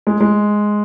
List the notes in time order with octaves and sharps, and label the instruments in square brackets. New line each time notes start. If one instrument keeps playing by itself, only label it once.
[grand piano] G#3
G#3